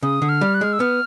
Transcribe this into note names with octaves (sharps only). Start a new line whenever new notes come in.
C#3 D#6
D3
F6
G3
F#6
G#3 F6
E6
B3 F6